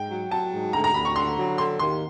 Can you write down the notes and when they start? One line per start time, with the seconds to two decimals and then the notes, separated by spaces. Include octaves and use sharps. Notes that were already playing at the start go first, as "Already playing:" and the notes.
Already playing: G#2 G5
0.10 F#3
0.31 F#3 A5
0.53 G#2
0.73 D2 A#5
0.84 A#5
0.94 D2 B5
1.05 C#6
1.16 D3 C6
1.38 F#3
1.58 D3 C6
1.79 D#2 C6